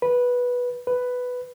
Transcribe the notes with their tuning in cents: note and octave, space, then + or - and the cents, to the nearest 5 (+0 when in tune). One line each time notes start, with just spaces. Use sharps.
B4 -10
B4 +5